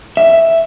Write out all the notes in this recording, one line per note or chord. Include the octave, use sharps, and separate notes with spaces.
E5